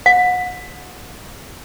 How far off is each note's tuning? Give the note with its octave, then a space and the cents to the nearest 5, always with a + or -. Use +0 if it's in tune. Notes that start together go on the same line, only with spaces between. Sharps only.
F#5 -30